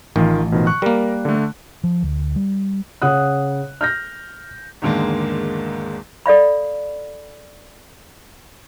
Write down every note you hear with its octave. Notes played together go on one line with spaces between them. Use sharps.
A1 D#3 F4
B2 D#3 F3
C#6 F#6
G3 A#3 A#4
D3 A3
F3
D2
G3
C#3 F#5 D#6 F#6
F6 G6 A#6
E2 G#2 D3 D#3 G#3 A#3
A4 D5 F5 B5